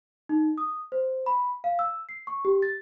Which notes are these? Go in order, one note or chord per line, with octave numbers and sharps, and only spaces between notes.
D#4
D#6
C5
B5
F5
E6
C7
C#6
G4
A6